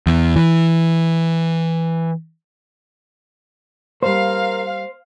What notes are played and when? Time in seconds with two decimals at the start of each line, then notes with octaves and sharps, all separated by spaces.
0.07 E2
0.36 E3
4.03 G3 A#3 A#4 C5 F5